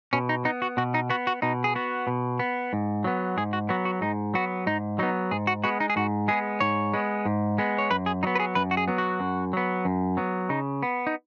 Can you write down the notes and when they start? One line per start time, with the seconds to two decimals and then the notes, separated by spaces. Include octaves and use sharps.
0.13 B2 C#4
0.29 D#4
0.45 B3 D#4
0.62 F#4
0.77 B2 F#4
0.94 D#4
1.10 B3 F#4
1.27 F#4
1.42 B2 D#4
1.64 G#4
1.75 B3 F#4
2.07 B2
2.39 B3
2.73 G#2
3.04 F#3 B3
3.37 G#2 G#4
3.53 F#4
3.69 F#3 B3 F#4
3.85 F#4
4.01 G#2 D#4
4.34 F#3 B3 F#4
4.66 G#2 D#4
4.99 F#3 B3 D#4
5.31 G#2 G#4
5.47 F#4
5.64 G#3 B3 F#4
5.80 D#4
5.90 G#4
5.96 G#2 F#4
6.28 G#3 B3 G#4
6.60 G#2 C#5
6.94 G#3 B3
7.26 G#2
7.58 G#3 B3
7.78 C#5
7.91 F#2 B4
8.06 G#4
8.23 F#3 B3 D#4
8.35 B4
8.40 G#4
8.55 F#2 B4
8.71 F#4
8.77 G#4
8.88 F#3 B3
8.98 F#4
9.20 F#2
9.53 F#3 B3
9.85 F#2
10.17 F#3 B3
10.49 C#3 D#4
10.83 B3
11.07 D#4